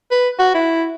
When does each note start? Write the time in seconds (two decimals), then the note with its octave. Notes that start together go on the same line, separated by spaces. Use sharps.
0.11 B4
0.39 F#4
0.54 E4